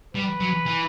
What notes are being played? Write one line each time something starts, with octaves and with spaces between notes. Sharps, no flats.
G3 B4
F#3
E3